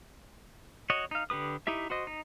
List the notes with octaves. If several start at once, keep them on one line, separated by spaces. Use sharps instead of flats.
F#4 C#5 D#5
D#4 F5
D3 G4 B4 D#6
D#4 E4 G4 E5
F#4 C5 D#5
D#4